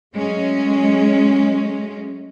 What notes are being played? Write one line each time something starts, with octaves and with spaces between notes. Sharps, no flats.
F#3 G#3 A3 C#4